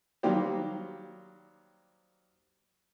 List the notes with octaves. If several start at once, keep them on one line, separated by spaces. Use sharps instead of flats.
D#3 F#3 G3 A#3 G4 C5